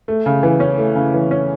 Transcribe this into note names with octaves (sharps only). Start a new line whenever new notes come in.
A3
C#3
E3
C#4
A3
C#3
E3
C#4